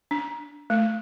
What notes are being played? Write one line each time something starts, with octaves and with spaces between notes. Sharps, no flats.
D4
A3